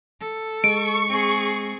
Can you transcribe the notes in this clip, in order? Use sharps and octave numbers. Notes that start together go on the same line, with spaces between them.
A4
G#3 C#6 D7
C4 G#4